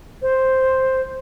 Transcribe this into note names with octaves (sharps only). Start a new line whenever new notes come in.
C5